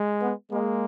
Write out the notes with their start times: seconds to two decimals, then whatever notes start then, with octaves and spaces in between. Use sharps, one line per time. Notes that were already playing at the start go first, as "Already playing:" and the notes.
Already playing: G#3
0.21 B3
0.51 G#3 A#3